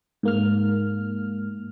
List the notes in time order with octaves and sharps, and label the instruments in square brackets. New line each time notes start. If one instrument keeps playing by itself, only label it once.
[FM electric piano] G#2 A#3 F6